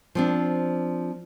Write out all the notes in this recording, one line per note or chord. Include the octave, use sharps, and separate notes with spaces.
F3 C4 D4